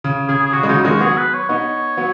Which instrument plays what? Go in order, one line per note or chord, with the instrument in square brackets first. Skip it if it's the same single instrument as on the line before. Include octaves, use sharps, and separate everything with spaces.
[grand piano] C#3
[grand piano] C#3 [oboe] G#4
[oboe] G#4
[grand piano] C#3 [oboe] F#4
[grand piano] G#3
[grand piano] C#3 F#3 [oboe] D#4
[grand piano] D#3 G#3 [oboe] F#4
[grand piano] F#3 B3 [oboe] G#4
[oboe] B4
C#5
[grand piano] B3 D#4 [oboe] C#5
[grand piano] F#3 B3